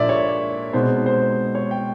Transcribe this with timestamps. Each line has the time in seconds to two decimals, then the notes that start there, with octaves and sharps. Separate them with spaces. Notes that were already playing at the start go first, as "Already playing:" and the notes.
Already playing: A#2 F3 A#3 D4 D5 E5
0.09 C#5
0.73 B2 G#3 C4 D#4 C5
1.06 C5
1.55 C#5
1.71 G5